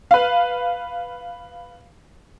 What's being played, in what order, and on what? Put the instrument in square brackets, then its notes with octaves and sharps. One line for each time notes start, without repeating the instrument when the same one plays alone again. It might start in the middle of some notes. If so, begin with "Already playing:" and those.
[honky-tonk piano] B4 F5